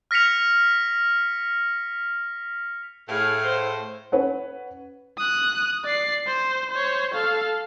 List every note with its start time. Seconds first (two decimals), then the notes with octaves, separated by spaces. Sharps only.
0.11 F6 A#6 B6 C#7 F7
3.08 A2 G#4 F5
3.44 C5
4.12 C#4 B4 C#5 F#5
5.18 D#6 F#6
5.84 D5 C7
6.27 C5
6.71 C5 C#5
7.14 A4 F5